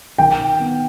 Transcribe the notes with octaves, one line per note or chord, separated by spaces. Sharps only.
D#3 G5
B3